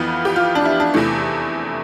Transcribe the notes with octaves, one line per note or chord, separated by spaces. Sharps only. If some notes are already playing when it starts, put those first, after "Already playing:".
Already playing: F2 E3 B3 F4
G4
F4
D4
E4
D4
E2 C3 E3 A3